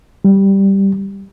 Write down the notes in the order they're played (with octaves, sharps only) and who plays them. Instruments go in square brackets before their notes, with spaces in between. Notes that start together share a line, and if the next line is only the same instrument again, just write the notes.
[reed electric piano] G3